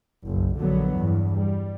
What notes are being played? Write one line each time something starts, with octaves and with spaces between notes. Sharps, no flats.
F#1 B1
A#1 D3 F#3 B3
E2 G2
G3